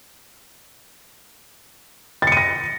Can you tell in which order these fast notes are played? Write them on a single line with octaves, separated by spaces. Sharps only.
A6 C#7 D#7 A#6